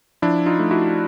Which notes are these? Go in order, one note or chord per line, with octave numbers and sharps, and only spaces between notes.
F3 D4 E4
D#4 F4
A3
E4 F#4